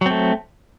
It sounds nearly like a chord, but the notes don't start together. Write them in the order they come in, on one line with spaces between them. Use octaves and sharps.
F#3 C4 A3